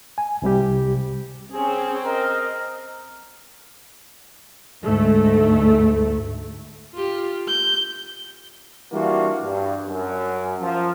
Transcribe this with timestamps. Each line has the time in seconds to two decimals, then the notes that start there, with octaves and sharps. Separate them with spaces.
0.18 G#5
0.42 C2 C3 G3 G4
1.51 C4 C#4 G#4
2.06 A#4 D#5
4.84 D2 G#2 A3
6.94 F4 G4
7.48 G6
8.92 E3 G3 A#3 D4 F4 F#4
9.43 G2
9.87 F#2
10.61 F3